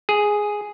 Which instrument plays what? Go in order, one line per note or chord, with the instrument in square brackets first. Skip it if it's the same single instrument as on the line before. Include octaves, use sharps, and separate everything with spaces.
[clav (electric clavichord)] G#4